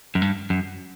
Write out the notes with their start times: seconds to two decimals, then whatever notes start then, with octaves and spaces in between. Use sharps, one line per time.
0.15 F#2
0.22 G2
0.50 F#2